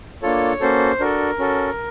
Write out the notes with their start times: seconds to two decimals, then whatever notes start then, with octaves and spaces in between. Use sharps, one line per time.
0.22 A#3 D4 F4 A4 C#5
0.60 A#3 C#4 F#4 A4 C5
1.00 D4 F#4 A4 A#4
1.39 C#4 F#4 A4